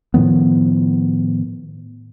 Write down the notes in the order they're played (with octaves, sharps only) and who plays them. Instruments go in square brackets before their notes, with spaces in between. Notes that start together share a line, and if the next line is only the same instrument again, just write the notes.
[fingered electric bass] A2 D#3 F3 B3